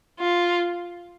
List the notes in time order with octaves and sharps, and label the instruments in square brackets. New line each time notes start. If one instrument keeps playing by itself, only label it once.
[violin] F4